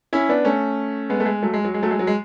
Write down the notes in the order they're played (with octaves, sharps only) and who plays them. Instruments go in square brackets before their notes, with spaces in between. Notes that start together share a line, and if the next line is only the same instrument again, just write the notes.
[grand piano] C#4 E4
B3 D4
A3 C#4
G#3 B3
A3
G#3
F#3 A3
G#3
F#3
G#3
F#3 A3
G#3
F#3
G#3